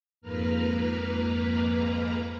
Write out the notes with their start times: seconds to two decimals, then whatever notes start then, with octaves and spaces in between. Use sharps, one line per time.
0.21 F2 G#2 A#3 B4 A#5 F6